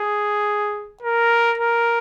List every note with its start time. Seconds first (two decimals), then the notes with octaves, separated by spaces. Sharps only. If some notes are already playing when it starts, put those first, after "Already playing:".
Already playing: G#4
1.03 A#4
1.58 A#4